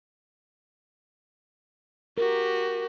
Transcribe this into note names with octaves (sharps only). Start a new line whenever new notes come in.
F#4 G4 A#4